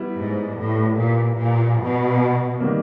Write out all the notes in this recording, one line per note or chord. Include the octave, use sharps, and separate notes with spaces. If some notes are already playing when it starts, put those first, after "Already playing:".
Already playing: G3 B3 E4
G#2
A2
A#2
A#2
B2
D#3 G3 A#3